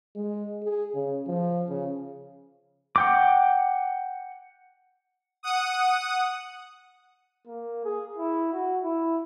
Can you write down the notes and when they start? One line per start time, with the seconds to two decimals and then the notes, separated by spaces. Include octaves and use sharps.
0.15 G#3
0.63 G#4
0.94 C#3
1.27 F3
1.69 C#3
2.96 F#5 G5 D6
5.43 F#5 D#6
7.47 A#3
7.85 G#4
8.17 E4
8.53 F#4
8.84 E4